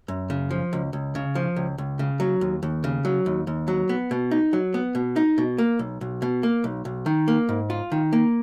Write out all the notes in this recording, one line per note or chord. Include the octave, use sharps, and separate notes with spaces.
F#2
C#3
F3
C#2
C#2
C#3
F3
C#2
C#2
C#3
F#3
D#2
D#2
C#3
F#3
D#2
D#2
F#3
B3
B2
D#4
F#3
B3
B2
D#4
B2
A#3
B1
B1
B2
A#3
B1
B1
D#3
A#3
G#2
F4
D#3
A#3